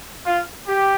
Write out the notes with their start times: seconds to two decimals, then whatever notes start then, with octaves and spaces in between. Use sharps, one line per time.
0.26 F4
0.67 G4